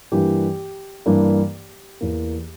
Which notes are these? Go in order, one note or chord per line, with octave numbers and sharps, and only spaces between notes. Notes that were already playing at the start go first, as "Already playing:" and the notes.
G2 E3 A#3 D4 G4
G2 E3 A#3 D4
E2 E3 A#3